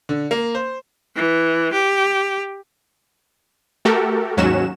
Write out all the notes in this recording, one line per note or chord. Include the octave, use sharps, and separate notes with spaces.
D3
A#3
C5
E3
G4
A3 F#4 G4 A4 A#4
D#2 G#2 F#3 C#4 F#4 E7